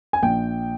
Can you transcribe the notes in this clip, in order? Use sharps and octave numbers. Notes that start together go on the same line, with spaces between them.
G#5
A#1 G5